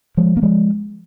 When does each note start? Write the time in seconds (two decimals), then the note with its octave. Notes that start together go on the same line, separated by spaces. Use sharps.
0.17 F3 G#3
0.37 A#3
0.42 F3 G#3